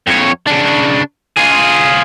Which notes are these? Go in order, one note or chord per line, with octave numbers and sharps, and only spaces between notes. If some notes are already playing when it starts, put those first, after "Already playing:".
F2 C#5
C#3 D4
F4 G#4